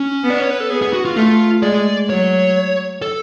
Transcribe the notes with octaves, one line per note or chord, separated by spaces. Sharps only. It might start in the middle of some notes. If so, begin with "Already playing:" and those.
Already playing: C#4
B3
D5
C#5
B4
A4
B3 G#4
G#4
F#4
F4
A3 F4
G#3 D5
F#3 C#5
A4